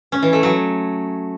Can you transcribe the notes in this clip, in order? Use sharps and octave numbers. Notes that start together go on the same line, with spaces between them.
C#4
E3
A3
F#3